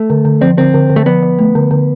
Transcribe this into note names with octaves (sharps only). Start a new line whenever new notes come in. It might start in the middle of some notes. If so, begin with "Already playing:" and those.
Already playing: A3
D3
D3
F3 C4
D3 C4
D3
D3
A3
F3 B3
F3
A3
D3
D3